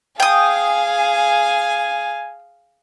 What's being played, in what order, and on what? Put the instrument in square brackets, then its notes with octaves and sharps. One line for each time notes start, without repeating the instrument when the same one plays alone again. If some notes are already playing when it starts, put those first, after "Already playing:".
[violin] G#4 F5 [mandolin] G5 D#6 [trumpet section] G#5